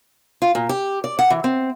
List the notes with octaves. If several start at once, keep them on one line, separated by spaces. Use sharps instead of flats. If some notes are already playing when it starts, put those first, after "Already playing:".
F4
A#2
G4
D5
F#5
E3
C4